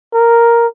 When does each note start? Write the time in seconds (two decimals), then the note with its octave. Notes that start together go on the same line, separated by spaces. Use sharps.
0.14 A#4